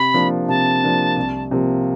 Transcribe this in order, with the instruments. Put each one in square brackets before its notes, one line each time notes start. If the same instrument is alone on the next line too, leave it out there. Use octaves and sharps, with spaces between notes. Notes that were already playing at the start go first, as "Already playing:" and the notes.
Already playing: [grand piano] C3 [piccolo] B5
[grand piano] F3 A#3 D4
[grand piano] C3 [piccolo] A5
[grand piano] F3 A#3 D4
C2
C3 F3 A#3